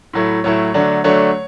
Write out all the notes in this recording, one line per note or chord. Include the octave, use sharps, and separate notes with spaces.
A2 F#3 A3 E4
A2 F#3 A3 E4 C#5
D3 F#3 A3 D4
D3 F#3 A3 D4 C#5